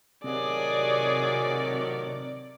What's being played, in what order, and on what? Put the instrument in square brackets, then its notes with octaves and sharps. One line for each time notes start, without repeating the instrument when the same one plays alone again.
[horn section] A2 D#3 F#3 [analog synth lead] C3 [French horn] G#4 [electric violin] D5